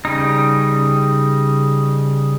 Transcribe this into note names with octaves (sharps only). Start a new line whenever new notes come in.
C#3 G3 D#4